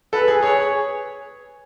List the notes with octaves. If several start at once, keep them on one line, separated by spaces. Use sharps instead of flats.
A4 B4
G#4
G#4 C#5